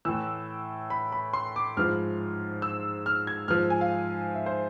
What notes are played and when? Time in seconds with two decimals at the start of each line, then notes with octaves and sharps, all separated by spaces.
0.05 A2 E3 E6
0.90 B5
1.12 B5
1.33 C6
1.56 D6
1.77 G#2 F3 F6
2.62 E6
3.06 F6
3.27 G#6
3.48 G#2 F3 F6
3.70 G#5
3.81 F5
4.35 E5
4.46 C5